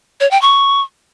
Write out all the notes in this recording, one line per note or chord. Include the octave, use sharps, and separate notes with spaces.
C#5
G5
C#6